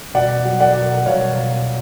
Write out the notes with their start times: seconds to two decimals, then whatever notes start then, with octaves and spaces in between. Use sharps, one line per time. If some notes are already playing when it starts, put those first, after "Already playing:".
0.14 B2 D5 F#5
0.45 F#3
0.60 D5 F#5
0.76 B2
1.06 B2 C#5 F5
1.37 B2